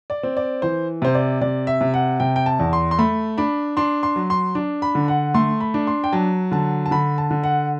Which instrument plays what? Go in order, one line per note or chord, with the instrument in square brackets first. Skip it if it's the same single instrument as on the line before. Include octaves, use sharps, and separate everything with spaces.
[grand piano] D5
C4
D5
E3 C5
C3 C5
D5
C3 D5
E5
C3
F#5
C3 G5
G5
A5
E2
C6
C6
A3 B5
D4 B5
D4 C6
C6
F#3
C6
D4
B5
D3
F#5
A3 C6
B5
D4
C6
G5
F#3 A5
D3 A5
A5
D3 B5
A5
D3
F#5